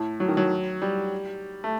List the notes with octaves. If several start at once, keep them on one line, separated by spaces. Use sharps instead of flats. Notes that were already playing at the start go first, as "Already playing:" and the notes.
Already playing: A2
F#3
D#3
F#3
G3
A3